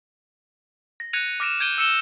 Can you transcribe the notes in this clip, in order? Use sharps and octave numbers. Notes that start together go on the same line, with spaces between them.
A#6
F#6 G#6 A#6 C#7 D#7 F7
D6 F6 A#6 D7 E7 F7
G6 G#6 D7 D#7 G7
E6 C#7 E7 G7